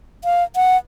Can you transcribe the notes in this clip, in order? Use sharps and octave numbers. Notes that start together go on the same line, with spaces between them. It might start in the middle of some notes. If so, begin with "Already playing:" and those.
F5
F#5